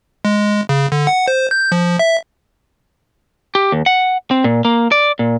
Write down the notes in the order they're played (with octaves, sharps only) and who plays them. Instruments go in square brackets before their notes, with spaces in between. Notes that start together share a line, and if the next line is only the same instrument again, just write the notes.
[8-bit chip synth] G#3
C#3
D3
F#5
C5
G6
F3
E5
[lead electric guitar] G4
D#2
F#5
C4
A#2
A#3
D5
A#2